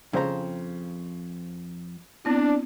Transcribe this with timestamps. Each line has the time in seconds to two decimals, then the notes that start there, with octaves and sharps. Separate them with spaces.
0.13 F2 C#3 C5 A#5
2.25 B3 C4 D4 E4